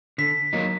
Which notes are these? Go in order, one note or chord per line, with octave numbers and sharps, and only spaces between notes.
D3 B6
F#3 A#3 D#4